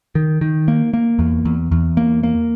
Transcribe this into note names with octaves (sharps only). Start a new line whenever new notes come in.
D#3
D#3
A#3
A#3
E2
E2
E2
A#3
A#3